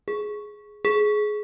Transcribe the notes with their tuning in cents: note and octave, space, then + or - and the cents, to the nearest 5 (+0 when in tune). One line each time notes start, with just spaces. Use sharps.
G#4 +10
G#4 +20